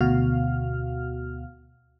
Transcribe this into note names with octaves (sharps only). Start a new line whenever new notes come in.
D2 B2 F#4 F5 F6